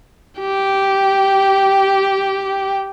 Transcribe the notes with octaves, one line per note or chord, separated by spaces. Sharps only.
G4 G5